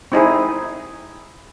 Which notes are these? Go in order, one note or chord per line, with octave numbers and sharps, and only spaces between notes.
C4 D#4 E4 G#4